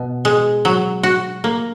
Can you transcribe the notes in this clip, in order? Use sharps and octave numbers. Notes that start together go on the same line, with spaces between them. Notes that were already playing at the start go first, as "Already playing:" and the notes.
Already playing: B2
G#3
F#3
F#4
A#3